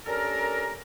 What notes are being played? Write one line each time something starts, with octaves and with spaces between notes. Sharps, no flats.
C#4 D4 G4 A4 A#4